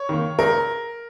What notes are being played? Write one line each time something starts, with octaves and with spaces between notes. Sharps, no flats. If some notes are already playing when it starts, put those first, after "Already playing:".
Already playing: C#5
D#3 A#3
C#2 A#4